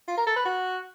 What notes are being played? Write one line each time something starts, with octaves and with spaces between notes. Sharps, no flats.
F4
A#4
A4
B4
F#4